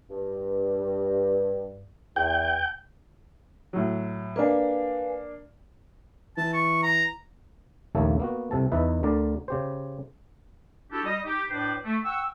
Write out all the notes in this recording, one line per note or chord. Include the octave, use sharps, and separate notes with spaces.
G2
E2 G5
A2 F#3
A#3 D4 B4 F5 G#5
E3 A5
C#6
A#5
A#1 D#2 C#3 A3 A#3 A4
A#3 B3 F#4
C2 C3 A4 A5
E2 D#4 E4 B4 E5
D2 D3 A#4 D5
C#3 G4 C5
D4 E4 F#4 G4 A4
G3 D#5 D#6
D#4 G4
A2 D4 B4 C5 D5 G5
A3
F#5 G5 C#6 E6